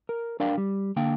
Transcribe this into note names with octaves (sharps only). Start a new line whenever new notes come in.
A#4
D4 A#4 D5 F5 G5
G3
D3 A#3 F5 G5